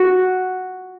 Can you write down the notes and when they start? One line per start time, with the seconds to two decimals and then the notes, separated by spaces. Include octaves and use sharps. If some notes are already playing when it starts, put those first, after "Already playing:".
Already playing: F#4